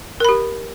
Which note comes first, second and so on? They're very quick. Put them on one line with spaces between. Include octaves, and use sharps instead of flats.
A#4 B5 G4